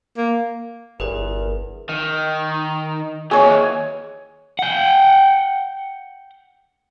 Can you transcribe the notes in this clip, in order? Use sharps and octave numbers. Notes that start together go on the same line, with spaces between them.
A#3
G1 E2 G4 G#4 A#4 B4
D#3
D#2 E3 G#4 C#5
F#5 G5